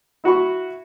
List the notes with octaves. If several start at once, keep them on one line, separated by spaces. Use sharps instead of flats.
E4 F#4 B5 C#6